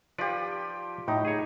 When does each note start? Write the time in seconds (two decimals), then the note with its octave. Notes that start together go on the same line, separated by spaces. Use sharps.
0.18 F3 G4 B4 D5
1.08 A2 D#4
1.25 G#4 C#5